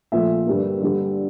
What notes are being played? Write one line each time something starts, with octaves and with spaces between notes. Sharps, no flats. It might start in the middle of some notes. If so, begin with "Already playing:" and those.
A#2 F3 A3 E5
G2 D3 G3 A#3
G2 D3 G3